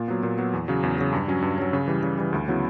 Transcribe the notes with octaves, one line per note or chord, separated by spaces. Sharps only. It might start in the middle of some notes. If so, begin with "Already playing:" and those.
Already playing: A#2
F#3 B3
A#2
F#3 B3
E2
C#3 F#3
E2
C#3 F#3
G2
F#3 C#4
G2
F#3 C#4
C#3
E3 G3
C#3
E3 G3
D2
C#3 F#3 B3 E4